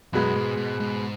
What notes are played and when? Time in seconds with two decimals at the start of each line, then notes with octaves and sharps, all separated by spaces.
0.13 F#2 B2 G#3 B3
0.36 G#2
0.57 G#2
0.80 G#2